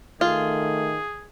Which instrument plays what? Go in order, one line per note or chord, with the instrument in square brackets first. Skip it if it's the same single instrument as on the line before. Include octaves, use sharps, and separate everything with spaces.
[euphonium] D#3 [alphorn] A3 [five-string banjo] F4 [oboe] G#4